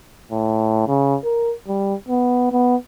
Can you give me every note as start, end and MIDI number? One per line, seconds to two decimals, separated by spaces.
0.31 0.87 45
0.88 1.16 49
1.24 1.53 70
1.68 1.95 55
2.09 2.51 59
2.52 2.76 59